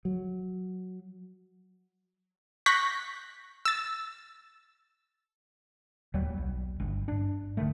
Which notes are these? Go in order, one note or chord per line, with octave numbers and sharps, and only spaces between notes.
F#3
C#6 F#6 G6 A#6 B6
E6 A6
D1 D#2 F#3 G3
B1
G1
G2 D4
D#1 D3 D#3 A3